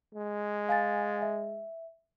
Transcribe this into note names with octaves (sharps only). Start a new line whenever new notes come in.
G#3
F5 G#5 A6
E5